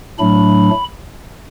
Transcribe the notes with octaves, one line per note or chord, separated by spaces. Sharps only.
A2 F#3 A3 D4 B5